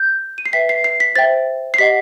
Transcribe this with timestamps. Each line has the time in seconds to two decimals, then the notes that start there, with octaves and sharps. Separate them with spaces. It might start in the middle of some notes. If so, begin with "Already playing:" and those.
Already playing: G6
0.38 D#7
0.46 C7
0.53 B4 E5 G5 B6
0.69 C7
0.84 C7
1.00 B6
1.16 C5 E5 G5 A6
1.74 C7
1.78 G4 D#5 F#5 B6